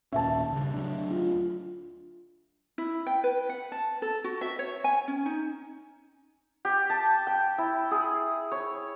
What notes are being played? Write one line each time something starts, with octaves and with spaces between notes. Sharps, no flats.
D#2 A#2 C#4 E5 A5
G2 C#3
D2 F#3 D4
F4
E4
G5
B4
F#5
A5
A4
F#4
E5
C#5
G#5
C#4
D#4
G4
A5
G5
E4
G#4
C#5